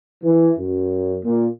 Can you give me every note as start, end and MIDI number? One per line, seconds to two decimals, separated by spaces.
0.24 0.52 52
0.59 1.18 42
1.24 1.47 46